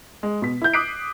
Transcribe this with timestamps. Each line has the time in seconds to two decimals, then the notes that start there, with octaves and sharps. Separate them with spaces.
0.23 G#3
0.42 B2 B6
0.62 E4 G6
0.73 D6 D#6 F#6 B6 C7 D7